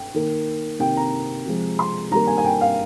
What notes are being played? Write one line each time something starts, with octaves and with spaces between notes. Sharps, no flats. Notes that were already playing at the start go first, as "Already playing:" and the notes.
Already playing: G5
D#3 A#3
C3 D#3 A#3 G5
A#5
C3 F3 G#3
C6
D#3 G3 A#3 A#5
G#5
G#5
G5
F5